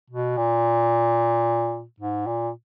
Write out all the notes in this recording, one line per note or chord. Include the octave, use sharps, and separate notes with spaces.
B2
A#2
G#2
A#2